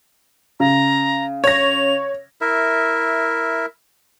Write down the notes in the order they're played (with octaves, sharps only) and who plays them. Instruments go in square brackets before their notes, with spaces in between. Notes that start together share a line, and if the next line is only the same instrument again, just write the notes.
[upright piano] C#3 [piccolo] A#5
[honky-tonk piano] C#5 A#6 [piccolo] F7
[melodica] E4 A#4 E5